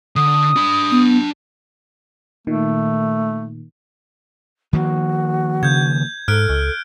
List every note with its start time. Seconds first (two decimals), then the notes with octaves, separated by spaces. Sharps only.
0.16 D3 D#6
0.56 D4 B5
0.91 B3
2.47 A#2 D#3 A3
4.73 D#3 F3 A#3 F#4
5.63 C#3 G6 G#6
6.28 G#2 A4 F6 F#6 D7
6.49 C#2